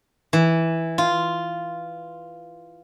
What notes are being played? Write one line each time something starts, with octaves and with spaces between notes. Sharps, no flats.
E3
F4